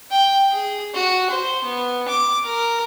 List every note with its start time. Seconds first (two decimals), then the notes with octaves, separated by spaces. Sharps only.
0.10 G5
0.52 G#4
0.94 F#4
1.30 C5
1.63 B3
2.08 D6
2.45 A#4